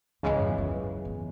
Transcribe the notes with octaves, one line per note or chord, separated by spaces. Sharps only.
C#2 G#2 C#3 E3 G#3
F#2
E2
F#2
E2